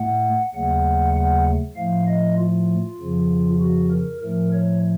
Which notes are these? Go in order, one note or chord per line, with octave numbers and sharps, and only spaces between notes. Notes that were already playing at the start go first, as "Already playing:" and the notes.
Already playing: A2 A3 F#5
D#2 C#3 F#3 A3 F#5
F#5
A2 F3 A3 F5
D#5
F4
F2 C#3 F3
F#4
A#4
A2 F3 A3 A#4
C#5